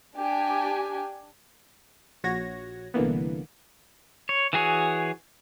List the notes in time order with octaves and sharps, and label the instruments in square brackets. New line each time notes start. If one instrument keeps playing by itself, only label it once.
[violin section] D4 G4 G#5
[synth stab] A#1 F#4 C#5 G#6 A#6
C2 D3 E3 A#3 B3
[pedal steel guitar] C#5
E3 F#4 G#4 C#5